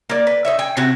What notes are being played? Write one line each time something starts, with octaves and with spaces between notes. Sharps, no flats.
A#3 D5
B4
D#4 C#5 E5
G5 G#5
C3 C4 F#4 G#5